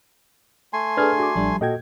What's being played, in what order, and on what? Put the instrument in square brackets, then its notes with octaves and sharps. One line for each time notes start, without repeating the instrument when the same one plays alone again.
[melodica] A3 G#5 C6
[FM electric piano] D4 G#4 A4 [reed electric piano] B4 F6 G#6
[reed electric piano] F#4 D6
[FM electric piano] A1 D4 [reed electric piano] F3 G3
[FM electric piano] A#2 G5 G#6 [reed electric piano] F#4 A4 D#5